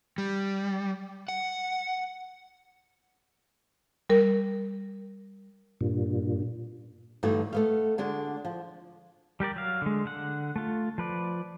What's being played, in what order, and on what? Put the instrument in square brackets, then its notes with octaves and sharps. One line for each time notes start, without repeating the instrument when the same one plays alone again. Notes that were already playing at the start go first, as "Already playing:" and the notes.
[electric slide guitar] G3
F#5
[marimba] G3 A#4
[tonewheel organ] G2 A#2
[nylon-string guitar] G2 D3 E3 A3 D#4 F#4
A3 B3 F5
D3 G#3 D4 F#4
F3
[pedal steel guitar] G3 G4 A#4 D5
F#3 F5
D3 G#3
D3 F#5
A3 F4
F3 B4 D5